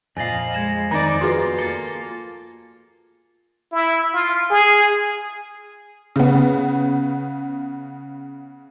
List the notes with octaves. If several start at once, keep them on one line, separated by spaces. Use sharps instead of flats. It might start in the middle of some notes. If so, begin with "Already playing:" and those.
F2 A#2 D#5 F5 G#5 A6 F#7
G#3 G#6 A#6 E7
F2 D#3 B3 D#4 D5
F4 F#4 G#4 B4
A#3 A4
E4
F4
G#4
C#3 B3